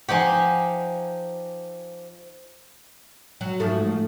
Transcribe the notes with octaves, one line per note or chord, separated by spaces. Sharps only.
F3 D#4 G4 F#5 G#5
F#3
G#2 F3 A3